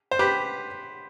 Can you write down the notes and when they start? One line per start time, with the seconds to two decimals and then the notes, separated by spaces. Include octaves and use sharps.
0.11 C5
0.19 G4 B4